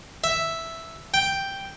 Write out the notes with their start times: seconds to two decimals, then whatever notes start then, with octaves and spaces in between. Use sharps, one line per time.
0.24 E5
1.14 G5